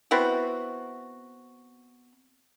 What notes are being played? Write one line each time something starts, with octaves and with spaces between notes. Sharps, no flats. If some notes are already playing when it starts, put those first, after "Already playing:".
B3 C4 E4 F#4